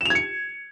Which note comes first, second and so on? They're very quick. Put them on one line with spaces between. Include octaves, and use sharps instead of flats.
E7 F7 G#6 C#7